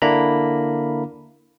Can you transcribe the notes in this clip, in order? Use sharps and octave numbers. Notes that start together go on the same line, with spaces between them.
D3 A#3 D4 E4 A#5 B5